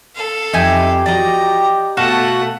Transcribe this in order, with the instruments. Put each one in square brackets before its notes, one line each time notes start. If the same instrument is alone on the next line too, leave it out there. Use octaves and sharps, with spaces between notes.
[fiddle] A4 F5
[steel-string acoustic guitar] F2 [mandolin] D#4 E4 G#5 [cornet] G4
[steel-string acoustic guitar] F3 F#4 [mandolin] D5 D#5 [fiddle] A#5
[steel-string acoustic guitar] B2 G#5 [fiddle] A3 F#5 [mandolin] F#4 A4 F5